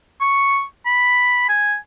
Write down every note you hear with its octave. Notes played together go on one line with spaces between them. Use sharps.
C#6
B5
G#5